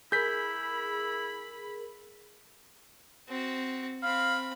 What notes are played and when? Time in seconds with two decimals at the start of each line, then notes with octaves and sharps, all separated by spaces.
0.12 E4 G#4 A#4 B5 G6 B6
3.28 C4 F#4
4.03 C4 F5 B5